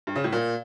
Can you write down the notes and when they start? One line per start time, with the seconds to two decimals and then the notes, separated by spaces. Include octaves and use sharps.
0.07 G2
0.16 C#3
0.24 A2
0.33 A#2